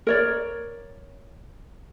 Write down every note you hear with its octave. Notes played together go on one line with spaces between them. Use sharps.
A#4 C#5 D5